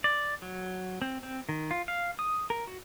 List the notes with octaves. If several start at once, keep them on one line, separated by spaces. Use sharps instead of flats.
D5
F#3
C4
C4
D#3
F4
F5
D#6
A#4
F#4